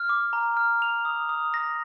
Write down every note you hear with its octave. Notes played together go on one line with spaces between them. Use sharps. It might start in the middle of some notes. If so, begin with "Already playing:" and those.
Already playing: F6
D6
A#5
F6
F7
D#6
D#6
A#6